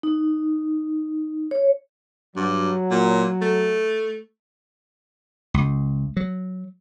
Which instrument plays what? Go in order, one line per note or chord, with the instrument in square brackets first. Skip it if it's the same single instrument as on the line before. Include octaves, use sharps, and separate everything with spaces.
[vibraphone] D#4
C#5
[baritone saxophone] G2 [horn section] F#3
[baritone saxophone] A#2
A3
[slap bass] C#2
F#3